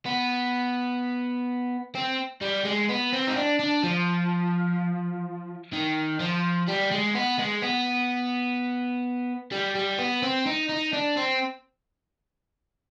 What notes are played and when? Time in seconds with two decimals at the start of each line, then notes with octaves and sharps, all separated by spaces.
0.06 B3
1.95 C4
2.42 G3
2.65 G#3
2.89 B3
3.13 C4
3.28 D#4
3.36 D4
3.60 D4
3.84 F3
5.73 D#3
6.20 F3
6.68 G3
6.91 G#3
7.15 B3
7.39 G#3
7.62 B3
9.52 G3
9.75 G3
9.99 B3
10.23 C4
10.46 D#4
10.69 D#4
10.93 D4
11.17 C4